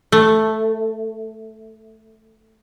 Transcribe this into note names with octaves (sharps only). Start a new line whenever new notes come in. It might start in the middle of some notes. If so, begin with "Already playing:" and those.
A3